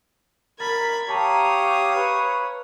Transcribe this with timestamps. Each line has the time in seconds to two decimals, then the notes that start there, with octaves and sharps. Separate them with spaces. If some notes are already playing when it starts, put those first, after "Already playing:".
0.60 A#4 B5 G#6 A6
1.09 G4 C#5 F5 A5 A#5 D#6
1.96 B4